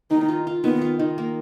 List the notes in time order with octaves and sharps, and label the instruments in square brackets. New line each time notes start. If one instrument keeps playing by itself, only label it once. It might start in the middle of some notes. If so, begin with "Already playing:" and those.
[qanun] D#3 [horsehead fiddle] D#4
[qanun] F4
F4
[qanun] D#3 [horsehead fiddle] B3
[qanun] F4
D#3
A#3